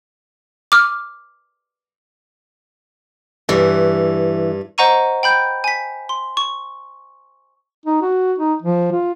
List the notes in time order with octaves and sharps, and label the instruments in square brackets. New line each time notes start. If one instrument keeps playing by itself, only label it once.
[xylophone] D6 F6
[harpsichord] G2 [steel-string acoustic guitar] E3
[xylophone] C5 D#5 F#5 A#5 C#6 D#7
G5 B5 G6
G#5 B6
C6
C#6
[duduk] D#4
F#4
D#4
F3
F4